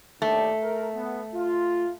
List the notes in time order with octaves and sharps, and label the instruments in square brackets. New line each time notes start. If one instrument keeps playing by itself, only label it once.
[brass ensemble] D#2 D4 G4 [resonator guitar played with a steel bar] A3
[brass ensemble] A#4
B3
F4